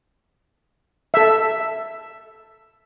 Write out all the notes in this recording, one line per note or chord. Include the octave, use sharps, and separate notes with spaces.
A4 E5